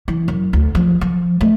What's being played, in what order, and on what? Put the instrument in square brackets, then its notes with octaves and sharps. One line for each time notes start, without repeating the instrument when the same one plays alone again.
[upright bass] E3
F#2
D2
F3
F3
A3